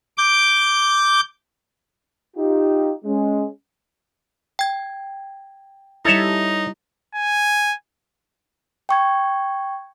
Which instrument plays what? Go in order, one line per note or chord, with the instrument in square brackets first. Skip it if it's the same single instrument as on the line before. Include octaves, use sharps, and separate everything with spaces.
[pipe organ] D6 G6
[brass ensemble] D#4 F4 G4
G#3 C#4
[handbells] G5 G#6
[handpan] G3 E4 [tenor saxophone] D#4 [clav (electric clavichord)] A4 C#5 E5
[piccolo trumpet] G#5
[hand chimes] G5 C#6 G#6